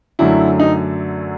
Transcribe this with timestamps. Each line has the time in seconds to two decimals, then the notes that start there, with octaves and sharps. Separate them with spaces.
0.19 F#2 D3 F#3 A3 E4
0.60 D#4